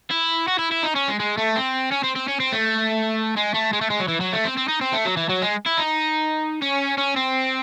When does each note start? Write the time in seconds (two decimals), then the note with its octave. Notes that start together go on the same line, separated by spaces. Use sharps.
0.11 E4
0.48 F#4
0.59 E4
0.71 E4
0.83 D#4
0.95 C#4
1.08 G#3
1.20 G#3
1.38 A3
1.56 C4
1.92 C#4
2.04 C4
2.16 C4
2.28 C#4
2.40 C4
2.52 A3
3.37 G#3
3.55 A3
3.73 G#3
3.81 A3
3.90 G#3
4.00 F#3
4.08 E3
4.21 F#3
4.33 A3
4.45 C4
4.57 C4
4.68 D#4
4.81 C4
4.93 A3
5.05 F#3
5.17 E3
5.29 F#3
5.42 G#3
5.66 E4
5.78 D#4
6.62 C#4
6.98 C#4
7.16 C4